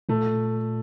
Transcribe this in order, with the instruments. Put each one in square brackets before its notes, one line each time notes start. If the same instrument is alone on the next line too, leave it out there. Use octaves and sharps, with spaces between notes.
[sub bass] A#2 [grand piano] A3